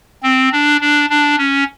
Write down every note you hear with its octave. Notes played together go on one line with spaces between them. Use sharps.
C4
D4
D4
D4
C#4